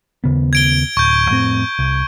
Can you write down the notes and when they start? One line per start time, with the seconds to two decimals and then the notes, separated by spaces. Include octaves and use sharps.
0.24 D#2 C#3 B3
0.53 G#6 D7 G7
0.97 D1 C#6 G6
1.29 F2 A2 C4
1.79 C2